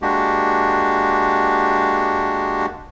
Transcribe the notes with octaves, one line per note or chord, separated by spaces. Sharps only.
G#3 A#3 D4 F#4 G4